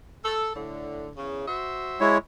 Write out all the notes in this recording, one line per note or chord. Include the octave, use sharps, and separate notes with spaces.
A4
A2 D3
E2 C#3
F#4 C5 E5
G#3 E4 C#5